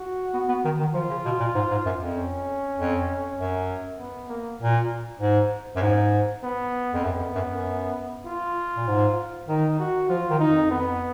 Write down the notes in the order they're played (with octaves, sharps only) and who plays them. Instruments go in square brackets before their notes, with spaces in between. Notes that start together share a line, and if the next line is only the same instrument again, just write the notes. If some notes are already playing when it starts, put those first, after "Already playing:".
Already playing: [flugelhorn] F#4
[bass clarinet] B3
B3
D#3
D#3
[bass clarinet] F3 [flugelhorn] F4
[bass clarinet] C#3
B2
A#2
G#2
G#2
F#2
F2
[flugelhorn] C#4
[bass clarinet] F2
F#2
[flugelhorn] B3
A#3
[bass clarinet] A#2
G#2
F#2
G#2
[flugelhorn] B3
[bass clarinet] F2
[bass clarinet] F#2 [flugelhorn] B3
[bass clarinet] F2
F#2
F#2
[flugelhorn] F4
[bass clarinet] A#2
G#2
[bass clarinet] D#3 [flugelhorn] D#4
[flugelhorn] F#4
[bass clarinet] F3 [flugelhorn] F4
[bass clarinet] D#3
[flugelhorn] D#4
[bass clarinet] F2
[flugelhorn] B3